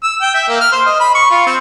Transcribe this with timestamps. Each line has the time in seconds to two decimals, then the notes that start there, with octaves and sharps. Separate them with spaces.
0.03 E6
0.22 G5
0.35 E5
0.48 A#3
0.60 F6
0.72 C5
0.86 D#5
1.00 B5
1.14 C#6
1.31 F4
1.47 C4